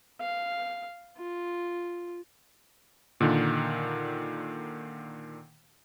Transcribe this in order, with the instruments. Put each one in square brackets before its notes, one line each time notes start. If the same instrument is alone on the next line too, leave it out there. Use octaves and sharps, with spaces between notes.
[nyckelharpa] F5
F4
[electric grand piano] A#2 D3 D#3